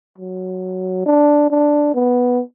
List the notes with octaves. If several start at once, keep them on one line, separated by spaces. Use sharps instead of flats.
F#3
D4
D4
B3